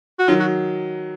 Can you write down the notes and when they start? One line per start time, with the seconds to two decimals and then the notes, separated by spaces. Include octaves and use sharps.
0.19 F#4
0.28 D#3 F#3 F4
0.40 F#4